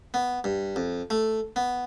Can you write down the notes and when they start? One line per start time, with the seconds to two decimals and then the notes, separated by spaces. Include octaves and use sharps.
0.14 B3
0.44 G2
0.76 F2
1.10 A3
1.56 B3